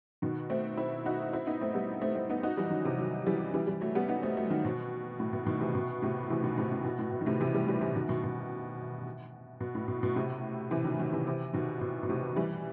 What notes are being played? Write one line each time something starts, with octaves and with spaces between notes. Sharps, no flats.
B2 D#3
A3 C4
C4 E4
D#4 F#4
C4 E4
B3 D#4
A3 C4
G3 B3
A3 C4
A3 C4
B3 D#4
D#4 F#4
E3 G3
D#3 F#3
C3 E3
D#3 F#3
E3 G3
E3 G3
E3 G3
F#3 A3
G3 B3
B3 D#4
A3 C4
F#3 A3
D#3 F#3
B2
A2
B2
B2 D#3
C3 E3
B2
A2 C3
C3 E3
B2 D#3
A2 C3
A2
B2
A2
B2
D#3
A2 C3
C3 E3
E3 G3
E3 G3
C3 E3
B2 D#3
B2 D#3
B2
B2
A2
B2
B2
A2 C3
C3 E3
D#3 F#3
D#3 F#3
C3 E3
C3 E3
B2 D#3
B2
B2
A2 C3
E3 G3